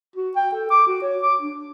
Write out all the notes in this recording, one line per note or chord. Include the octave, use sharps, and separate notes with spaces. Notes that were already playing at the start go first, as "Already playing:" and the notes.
F#4
G5
A4
D6
F#4
C#5
D6
D4